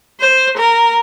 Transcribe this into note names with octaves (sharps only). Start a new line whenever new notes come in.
C5
A#4